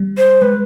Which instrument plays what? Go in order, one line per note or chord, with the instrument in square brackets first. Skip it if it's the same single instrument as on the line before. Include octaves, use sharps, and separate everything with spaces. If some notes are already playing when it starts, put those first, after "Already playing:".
Already playing: [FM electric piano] G3
[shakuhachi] C5
[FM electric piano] G#3 [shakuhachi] B4